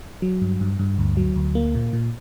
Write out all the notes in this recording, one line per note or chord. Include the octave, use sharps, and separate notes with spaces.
F#3
G2
G2
G2
D2
F#3
D2
A#3
A#2
A#2